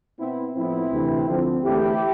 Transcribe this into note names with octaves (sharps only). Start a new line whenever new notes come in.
B2 B3 C4 E4
A2 F3 B3 C4 E4
D2 C3 E3
D2 D3 F3 C4
E2 D3 A3 C4 E4 G4